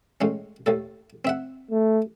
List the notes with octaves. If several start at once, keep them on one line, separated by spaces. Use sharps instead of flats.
A2 G#3 C#4
D#2 A2 A4
C4 E5 F#5
A3